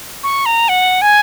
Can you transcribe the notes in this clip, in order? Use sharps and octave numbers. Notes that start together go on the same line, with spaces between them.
C#6
A#5
F#5
G#5